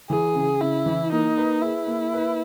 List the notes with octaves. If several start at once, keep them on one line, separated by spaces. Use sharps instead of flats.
E3 G#4
C#3
C#3 E4
E3
A#3 D#4
B4
E4 G#4
A#3
B4